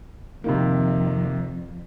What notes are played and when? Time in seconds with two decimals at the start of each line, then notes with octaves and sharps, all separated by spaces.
0.44 F2 C3 D#3 A#3